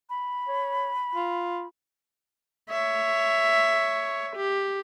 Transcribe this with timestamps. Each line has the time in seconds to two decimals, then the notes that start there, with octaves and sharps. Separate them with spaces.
0.10 B5
0.48 C#5
1.15 F4
2.69 C#5 E5
4.36 G4